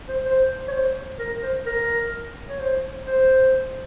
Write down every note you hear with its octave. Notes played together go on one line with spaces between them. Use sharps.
C5
C5
C#5
C5
A#4
C5
A#4
C#5
C5
C5